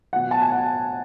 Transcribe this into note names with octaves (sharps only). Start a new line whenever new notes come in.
B2 F#3 F#5
A5
G#5
F#5